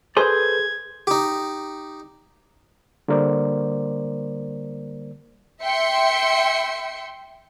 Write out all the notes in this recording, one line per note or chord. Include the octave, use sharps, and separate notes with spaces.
G#4 A4 B4 C5 G6 G#6
D#4 G4
D3 G3 A#3 A#4 C5 D5
E5 G5 C6 C#7